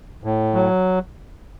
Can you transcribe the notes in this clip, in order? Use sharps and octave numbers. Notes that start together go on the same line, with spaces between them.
A2
F#3